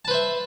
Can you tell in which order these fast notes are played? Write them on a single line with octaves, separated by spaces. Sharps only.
A5 B4 C5 E5